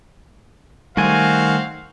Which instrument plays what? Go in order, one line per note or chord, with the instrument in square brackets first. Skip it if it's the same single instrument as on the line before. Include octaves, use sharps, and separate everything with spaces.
[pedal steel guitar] D#3 G#5 [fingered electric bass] G3 A3 [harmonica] C4 F#4 [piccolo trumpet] F5